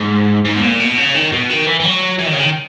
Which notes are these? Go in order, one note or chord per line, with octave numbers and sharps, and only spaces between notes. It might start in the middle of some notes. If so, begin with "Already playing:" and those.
Already playing: G#2
G#2
B2
A#2
B2
C#3
D#3
B2
D#3
E3
E3
F#3
E3
D#3
C#3
D#3